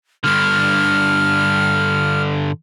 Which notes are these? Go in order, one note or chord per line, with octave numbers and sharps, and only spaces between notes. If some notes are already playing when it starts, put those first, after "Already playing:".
G2 D3 F6